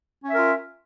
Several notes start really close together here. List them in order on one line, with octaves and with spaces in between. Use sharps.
C#4 E5 A#4 F4